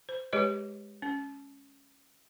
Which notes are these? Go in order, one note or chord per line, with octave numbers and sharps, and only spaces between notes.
C5
G#3 G4 G#4 B4 C#5 D#5
C#4